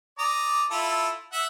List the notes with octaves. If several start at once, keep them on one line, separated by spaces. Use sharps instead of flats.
D5 A#5 D#6
E4 F4 A4
E5 F#5